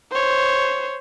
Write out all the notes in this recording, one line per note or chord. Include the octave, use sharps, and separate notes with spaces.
C5 C#5